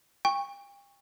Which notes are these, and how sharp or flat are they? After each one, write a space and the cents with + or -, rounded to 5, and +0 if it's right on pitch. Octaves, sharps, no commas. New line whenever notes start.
G5 +40 C#6 -5